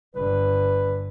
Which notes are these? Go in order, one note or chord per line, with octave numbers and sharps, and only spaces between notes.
G1 D3 B4